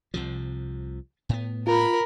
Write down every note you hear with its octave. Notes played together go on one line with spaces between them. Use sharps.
C2 C3 F3
A2 B3
F4 A#4 A#5 B5